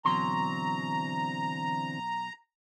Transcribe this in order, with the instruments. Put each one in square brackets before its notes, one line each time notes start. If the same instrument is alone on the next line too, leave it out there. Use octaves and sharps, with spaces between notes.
[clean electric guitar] B2 F#3 C6 [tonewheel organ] D3 E3 C4 [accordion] A#5